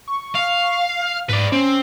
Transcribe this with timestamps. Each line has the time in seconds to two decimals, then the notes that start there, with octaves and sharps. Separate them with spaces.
0.08 C#6
0.35 F5
1.03 F6
1.29 G#2 B4 D5
1.52 C4 C#4